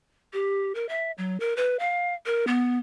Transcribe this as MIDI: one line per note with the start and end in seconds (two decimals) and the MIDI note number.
0.33 0.73 67
0.75 0.88 70
0.89 1.11 76
1.18 1.40 54
1.40 1.56 70
1.56 1.79 71
1.79 2.14 77
2.26 2.45 70
2.47 2.78 59